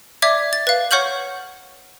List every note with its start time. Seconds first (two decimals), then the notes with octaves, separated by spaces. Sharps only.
0.22 D5 E5 D6 G#6
0.53 A6
0.67 B4 F5
0.91 C#5 F#5 C#6 F6 G6 F#7